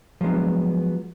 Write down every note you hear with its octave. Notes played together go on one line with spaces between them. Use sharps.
F3 F#3 G#3 B3 D4